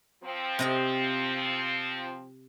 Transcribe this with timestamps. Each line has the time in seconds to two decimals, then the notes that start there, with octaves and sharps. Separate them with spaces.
0.23 F3 C4
0.59 C3 D#5 G5